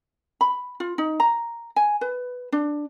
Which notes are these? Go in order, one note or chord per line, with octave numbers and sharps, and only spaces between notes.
B5
F4
D#4
A#5
G#5
B4
D4